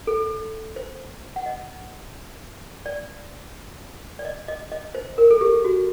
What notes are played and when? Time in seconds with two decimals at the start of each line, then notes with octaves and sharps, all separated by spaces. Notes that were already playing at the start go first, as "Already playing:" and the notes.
0.07 A4
0.76 C5
1.36 F#5
1.46 D#5
2.86 D5
4.19 D5
4.25 D#5
4.48 D#5
4.72 D#5
4.95 C5
5.18 A#4
5.31 A4
5.41 G4
5.65 F#4